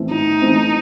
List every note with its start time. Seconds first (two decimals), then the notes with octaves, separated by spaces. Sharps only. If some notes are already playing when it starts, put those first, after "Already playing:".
Already playing: A2 E3 A3 C4
0.10 A2 D#4
0.42 E3 A3 C4